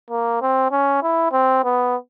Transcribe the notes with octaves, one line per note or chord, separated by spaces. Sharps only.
A#3
C4
C#4
E4
C4
B3